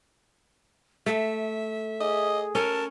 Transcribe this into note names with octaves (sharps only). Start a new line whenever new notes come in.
A3 E5
G#4 D#5
C#4 A#4 A5